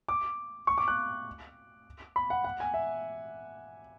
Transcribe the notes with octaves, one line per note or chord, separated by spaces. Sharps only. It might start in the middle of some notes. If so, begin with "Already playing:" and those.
D6
C#6
D6
F#6
B5
F#5
F#5
G#5
E5